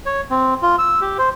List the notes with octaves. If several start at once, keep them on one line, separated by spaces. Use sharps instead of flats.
C#5
C4
F4
E6
G4
C5